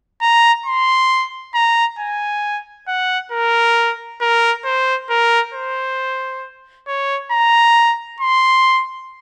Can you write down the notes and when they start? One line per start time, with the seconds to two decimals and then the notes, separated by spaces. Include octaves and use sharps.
0.21 A#5
0.66 C6
1.54 A#5
1.99 G#5
2.87 F#5
3.31 A#4
4.21 A#4
4.64 C5
5.09 A#4
5.54 C5
6.87 C#5
7.31 A#5
8.20 C6